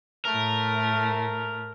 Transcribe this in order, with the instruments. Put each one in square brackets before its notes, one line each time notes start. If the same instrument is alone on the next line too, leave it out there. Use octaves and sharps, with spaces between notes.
[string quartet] A2 A3 [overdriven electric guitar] A#4